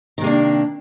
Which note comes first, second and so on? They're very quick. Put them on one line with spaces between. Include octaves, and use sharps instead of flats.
D#3 C3 A#3 D4